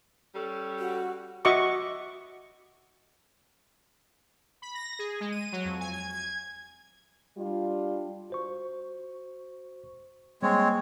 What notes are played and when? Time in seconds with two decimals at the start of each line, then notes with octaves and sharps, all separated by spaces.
0.35 G3 C#4 A4
0.79 F#4
1.45 F#4 D#5 E5 C#6 D6
4.62 B5
4.75 A#6
4.99 G#4
5.20 G#3
5.32 D#7
5.52 F#3
5.65 F2
5.80 G#5
5.93 G#6
6.10 G#6
7.37 G3 D4 F4
8.30 F#4 C5 C#6
10.43 G3 G#3 A#3 C4 C#5